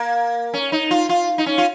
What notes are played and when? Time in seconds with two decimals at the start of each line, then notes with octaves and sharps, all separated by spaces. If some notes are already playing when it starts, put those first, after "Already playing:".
Already playing: A#3
0.54 C#4
0.72 D#4
0.91 F4
1.09 F4
1.38 D#4
1.46 C#4
1.58 F4